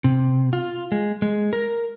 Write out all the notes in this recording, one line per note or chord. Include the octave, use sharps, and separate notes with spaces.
C3
F4
G#3
G#3
A#4